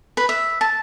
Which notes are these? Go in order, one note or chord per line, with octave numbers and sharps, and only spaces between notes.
B4
E5
A5